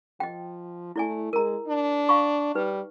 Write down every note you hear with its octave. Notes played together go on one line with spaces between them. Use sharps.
F3 D#5 G5
A3 E4 D5 G#5
G#3 A#4 A#5
D4
F5 B5 C#6
G3 D#4 B4